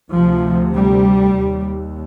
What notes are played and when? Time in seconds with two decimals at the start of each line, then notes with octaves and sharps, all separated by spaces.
0.10 D2 C3 F3
0.74 G3
1.38 D#2